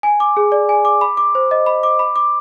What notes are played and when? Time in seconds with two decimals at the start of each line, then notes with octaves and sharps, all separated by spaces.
0.03 G#5
0.20 D6
0.37 G#4
0.52 D5
0.69 G#5
0.85 D6
1.01 B5
1.17 D6
1.35 C5
1.51 D#5
1.66 B5
1.83 D6
1.99 B5
2.16 D6